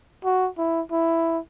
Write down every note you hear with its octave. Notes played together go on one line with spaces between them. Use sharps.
F#4
E4
E4